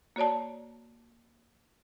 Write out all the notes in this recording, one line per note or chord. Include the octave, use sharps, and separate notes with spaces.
A#3 F#4 C#5 D5 A5